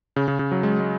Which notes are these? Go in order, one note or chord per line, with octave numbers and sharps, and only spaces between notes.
C#3
C#3
C#3
F#3
G#3
G#3